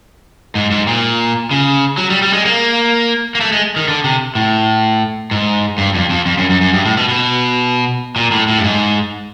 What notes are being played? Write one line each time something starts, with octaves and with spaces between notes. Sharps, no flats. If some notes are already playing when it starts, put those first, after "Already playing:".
G#2
G#2
A#2
C#3
F#3
G3
G3
G#3
A#3
A#3
A3
G#3
D#3
D3
C3
A2
G#2
G2
F2
F2
F2
F#2
F#2
F#2
G2
A2
B2
B2
A#2
A2
A2
G2
G#2